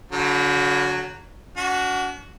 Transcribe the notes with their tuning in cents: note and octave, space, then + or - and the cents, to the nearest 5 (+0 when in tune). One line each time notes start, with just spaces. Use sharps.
D3 -45 F#3 -5
D4 -45 F#4 +0